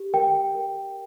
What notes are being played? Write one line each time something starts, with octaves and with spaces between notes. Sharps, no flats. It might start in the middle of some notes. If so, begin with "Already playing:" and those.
Already playing: G4
A#4 G5
A#4